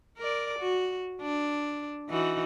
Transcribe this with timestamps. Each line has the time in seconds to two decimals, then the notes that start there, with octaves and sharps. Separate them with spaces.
0.18 A#4 D5
0.59 F#4
1.21 D4
2.10 E3 D#4 F#4